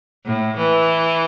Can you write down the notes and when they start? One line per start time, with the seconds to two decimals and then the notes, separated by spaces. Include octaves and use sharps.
0.26 A2
0.57 E3